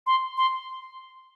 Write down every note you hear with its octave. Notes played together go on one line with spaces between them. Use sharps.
C6
C6